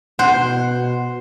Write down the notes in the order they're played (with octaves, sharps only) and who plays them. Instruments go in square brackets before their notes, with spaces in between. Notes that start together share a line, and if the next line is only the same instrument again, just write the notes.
[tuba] B2 [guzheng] C5 [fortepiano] F#5